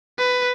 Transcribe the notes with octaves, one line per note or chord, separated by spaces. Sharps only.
B4